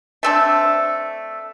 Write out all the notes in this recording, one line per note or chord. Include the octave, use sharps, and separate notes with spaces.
A3 C4 D4